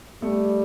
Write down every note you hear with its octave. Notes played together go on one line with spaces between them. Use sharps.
G3 A3